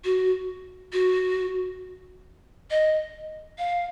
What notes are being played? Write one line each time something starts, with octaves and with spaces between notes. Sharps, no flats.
F#4
F#4
D#5
F5